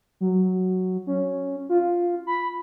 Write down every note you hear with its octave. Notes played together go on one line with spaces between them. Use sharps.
F#3
C#4
F4
B5